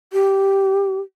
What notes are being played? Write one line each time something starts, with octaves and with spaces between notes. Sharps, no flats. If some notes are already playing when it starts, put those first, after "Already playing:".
G4